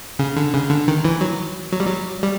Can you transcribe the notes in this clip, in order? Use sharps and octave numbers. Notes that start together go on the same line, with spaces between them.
C#3
D3
C#3
D3
D#3
E3
F#3
F#3
G3
F#3
G3